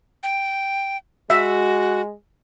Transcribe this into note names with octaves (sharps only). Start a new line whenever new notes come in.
G5
G#3 F#4 E5